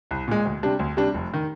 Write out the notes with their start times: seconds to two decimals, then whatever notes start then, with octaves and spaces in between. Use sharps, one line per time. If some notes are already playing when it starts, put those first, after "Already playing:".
0.11 C2
0.28 A#2 G#3
0.45 D2
0.63 C3 G3 D4
0.79 D2
0.97 C3 G3 D4
1.14 F1
1.34 D#3